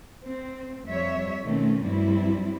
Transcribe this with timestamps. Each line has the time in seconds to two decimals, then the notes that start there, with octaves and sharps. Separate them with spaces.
0.24 C4
0.87 F2 G3 C#5 E5
1.44 B2 D#3 A3 C4 C#4
1.82 G2 F#3 G3 C4 E4